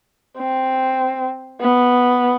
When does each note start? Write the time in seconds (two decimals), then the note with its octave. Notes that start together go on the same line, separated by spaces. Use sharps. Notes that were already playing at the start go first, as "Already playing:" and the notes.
0.38 C4
1.61 B3